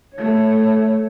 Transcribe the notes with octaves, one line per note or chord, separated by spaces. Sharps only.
A3 C#5